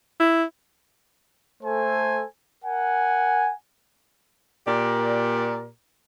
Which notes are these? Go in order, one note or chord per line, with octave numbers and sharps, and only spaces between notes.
E4
A3 A4 C5 G#5
A#4 F#5 G#5
A#2 G4 A#4 D5